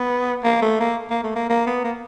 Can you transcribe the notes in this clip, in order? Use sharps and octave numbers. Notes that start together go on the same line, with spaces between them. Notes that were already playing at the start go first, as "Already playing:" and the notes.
Already playing: B3
A#3
A3
A#3
A#3
A3
A#3
A#3
B3
A#3